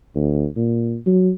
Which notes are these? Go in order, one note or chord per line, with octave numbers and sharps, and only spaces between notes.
D2
A#2
F#3